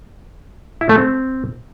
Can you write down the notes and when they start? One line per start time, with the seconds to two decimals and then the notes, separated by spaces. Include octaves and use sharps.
0.81 E4
0.89 A3
0.98 C4